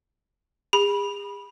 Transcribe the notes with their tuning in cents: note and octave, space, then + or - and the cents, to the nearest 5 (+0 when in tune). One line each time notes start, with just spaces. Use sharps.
G#4 -45 B5 -15